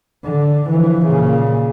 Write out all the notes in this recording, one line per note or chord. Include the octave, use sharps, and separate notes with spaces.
D3
E3 F3
A#2 C#3